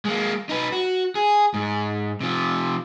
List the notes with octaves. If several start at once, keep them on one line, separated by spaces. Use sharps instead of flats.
G#3 A#3
D#4 B4
F#4
G#4
G#2
C3 F3